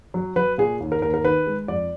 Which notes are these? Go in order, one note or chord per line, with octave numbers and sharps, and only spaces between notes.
F#3
F#3 B4
A#2 G#4
D#2
A#4
D#2 A#4
A#4
D#3 B4
G#3
F2 D5